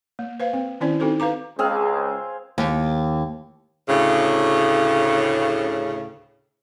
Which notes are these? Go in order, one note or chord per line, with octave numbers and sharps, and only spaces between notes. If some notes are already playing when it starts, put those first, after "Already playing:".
A#3
B4 C5 F5
C4
D#3 C4 C#4 E4 C5 D5
C4 D#4 F#4 A4 C5
B4 F5 A#5 D6
C#2 C4 G#4 F5
D#2
D2 A2 C#3